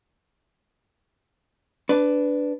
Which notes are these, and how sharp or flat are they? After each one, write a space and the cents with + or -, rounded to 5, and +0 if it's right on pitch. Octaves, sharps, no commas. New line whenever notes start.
D4 -5 B4 +10